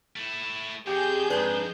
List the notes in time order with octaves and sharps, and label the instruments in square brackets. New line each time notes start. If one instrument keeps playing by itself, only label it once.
[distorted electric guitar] A3 E4
[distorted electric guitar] F2 [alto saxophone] G4 [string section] G#4 G6
[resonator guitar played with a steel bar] G#2 D4 [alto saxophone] B4